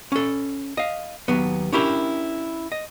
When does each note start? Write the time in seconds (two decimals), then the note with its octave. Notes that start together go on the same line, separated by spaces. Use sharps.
0.12 C#4 A4
0.77 D#5 F5
1.28 D#2 F#3 B3
1.72 C#4 D4 E4 G4 A#4
2.72 D#5